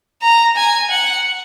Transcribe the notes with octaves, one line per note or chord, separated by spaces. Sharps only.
A#5
G#5
F#5